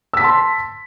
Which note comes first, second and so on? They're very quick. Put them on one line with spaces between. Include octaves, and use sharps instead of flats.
E6 B6 A5 C6